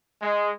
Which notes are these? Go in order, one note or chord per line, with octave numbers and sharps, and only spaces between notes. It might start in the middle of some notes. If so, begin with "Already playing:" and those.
G#3